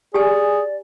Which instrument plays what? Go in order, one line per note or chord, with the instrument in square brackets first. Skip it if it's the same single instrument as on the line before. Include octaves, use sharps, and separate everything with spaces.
[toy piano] G4 G#5 [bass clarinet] G#4 [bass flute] D5